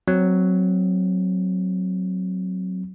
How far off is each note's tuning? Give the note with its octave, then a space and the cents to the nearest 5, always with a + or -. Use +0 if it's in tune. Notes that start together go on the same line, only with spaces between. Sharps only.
F#3 +0 C4 -5